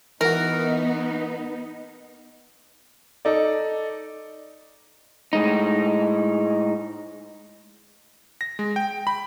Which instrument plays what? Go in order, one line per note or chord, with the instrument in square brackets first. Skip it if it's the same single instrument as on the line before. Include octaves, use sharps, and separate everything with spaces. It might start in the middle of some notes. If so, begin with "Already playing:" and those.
[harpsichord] E3 F#4 [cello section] B3 D#4 [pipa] A#4
[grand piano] D#4 A4 D5
[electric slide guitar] A2 G#3 D#4
[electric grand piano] A#6
G#3
G5
B5